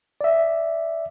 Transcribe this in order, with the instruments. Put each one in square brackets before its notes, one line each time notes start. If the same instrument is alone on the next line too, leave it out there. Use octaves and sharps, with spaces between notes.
[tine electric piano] D5 E5